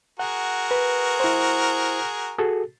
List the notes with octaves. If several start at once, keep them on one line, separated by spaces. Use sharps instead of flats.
F#4 G#4 A#4 F#5
B4
E4 C5
F#4 G#4 A4